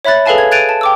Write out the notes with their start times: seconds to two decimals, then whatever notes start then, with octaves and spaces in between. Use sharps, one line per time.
0.05 C#5 E5 B5 F#6 A6
0.26 G#4 A4 B4 F5 G#5 A5
0.38 G#6
0.51 F#6 G#6 A6 D7 D#7 F7
0.69 A5
0.81 G5 D6 E6